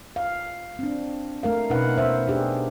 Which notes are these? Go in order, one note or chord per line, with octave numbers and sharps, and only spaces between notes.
F5
C4 D4
A3 A#4 F5
B2 C#4 D#4 B4 F#5
B3 C5 E5
D4 G4 G#4